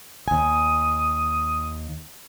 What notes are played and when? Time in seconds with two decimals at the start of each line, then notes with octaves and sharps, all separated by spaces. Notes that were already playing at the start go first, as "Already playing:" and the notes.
0.28 D#2 G#5 D#6